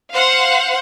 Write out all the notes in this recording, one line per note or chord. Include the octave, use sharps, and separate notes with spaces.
C5 F5 F#5